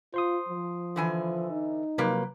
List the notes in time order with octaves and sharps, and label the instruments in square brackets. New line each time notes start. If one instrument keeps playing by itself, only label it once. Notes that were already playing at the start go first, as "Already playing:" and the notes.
[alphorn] F4 [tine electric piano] C5 C6 D#6
[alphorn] F3
[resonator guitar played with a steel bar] D3 E3 G#5
[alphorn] D#4
[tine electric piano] C3 F#3 [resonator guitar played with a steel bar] F3 A#3 B4